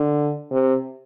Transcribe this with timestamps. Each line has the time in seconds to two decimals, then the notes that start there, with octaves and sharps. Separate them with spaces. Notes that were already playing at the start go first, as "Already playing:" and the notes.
Already playing: D3
0.51 C3